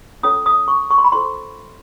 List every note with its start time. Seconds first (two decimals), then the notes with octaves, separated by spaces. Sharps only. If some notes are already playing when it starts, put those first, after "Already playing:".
0.23 C#4 F4 A4 C#5 D#6
0.46 D#6
0.68 C#6
0.90 C#6
0.98 C6
1.04 B5
1.12 F4 A4 C5 C6